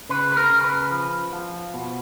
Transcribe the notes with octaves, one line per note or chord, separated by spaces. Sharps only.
C#3 B4
B4
A#4
C#3
B4
F3
F3
B2